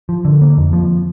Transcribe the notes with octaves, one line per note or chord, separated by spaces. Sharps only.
F3
D3
A#3
F2
F3